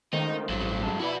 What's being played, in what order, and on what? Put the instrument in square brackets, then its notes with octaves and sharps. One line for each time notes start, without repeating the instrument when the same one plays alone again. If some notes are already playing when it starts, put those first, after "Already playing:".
[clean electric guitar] C#2 A3 C4 [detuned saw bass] D#3 [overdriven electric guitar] D#4
[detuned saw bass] A1 [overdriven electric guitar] G2 F#3
[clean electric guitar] F#2 G#3 A4
[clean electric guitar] F2 D5 [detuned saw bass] E4 [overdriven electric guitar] F#4 B4